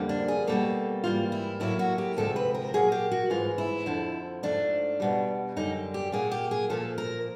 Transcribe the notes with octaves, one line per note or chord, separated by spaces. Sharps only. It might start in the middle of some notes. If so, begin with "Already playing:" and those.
Already playing: F2 D3 G3 A#3
D4
G#4
B2 G3 A#3 A4
G#2 E3 G3 A#3 F4
E4
A2 F#3 A#3 E4
F#4
G4
D2 C3 F3 G#3 A4
B4
A#4
A#2 F#3 A#3 G#4
G4
F#4
G#2 E3 G#3 F4
E4
F2 D3 F3
G#2 F3 A3 D4
E2 B2 G3
F#2 D3 G3 D#4
G4
A#2 F#3 A#3 G#4
G4
G#4
A#2 F3 A#3 A4
A#4